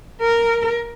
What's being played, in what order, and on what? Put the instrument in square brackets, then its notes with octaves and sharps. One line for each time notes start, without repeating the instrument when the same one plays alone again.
[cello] A#4